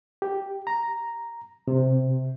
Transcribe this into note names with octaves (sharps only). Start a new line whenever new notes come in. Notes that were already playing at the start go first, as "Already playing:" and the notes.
G4
A#5
C3